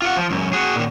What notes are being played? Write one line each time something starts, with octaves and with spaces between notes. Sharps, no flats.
F4 F#5
F3
C#2 F#2
F#4 G#4
A#2 D#3